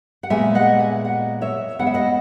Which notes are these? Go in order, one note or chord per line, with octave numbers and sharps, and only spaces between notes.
F#5
A#2 G#3 B3 E5 G#5
D#5 F#5
E5 G#5
D#5 F#5
C#5 E5
C#3 G#3 B3 F#5
E5
D#5 F#5